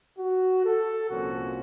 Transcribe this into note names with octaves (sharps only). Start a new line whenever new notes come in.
F#4
A4
C2 A#2 F3 A#3 C#4 F#4